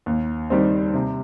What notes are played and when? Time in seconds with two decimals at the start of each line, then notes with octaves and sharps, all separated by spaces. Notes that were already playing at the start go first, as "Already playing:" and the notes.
0.06 D#2
0.50 D#3 G3 C4
0.94 C3